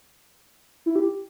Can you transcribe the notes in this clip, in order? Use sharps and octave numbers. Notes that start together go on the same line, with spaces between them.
E4
G4